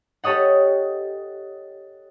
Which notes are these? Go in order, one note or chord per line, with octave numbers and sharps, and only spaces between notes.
G4 A4 C#5 D#5 F#5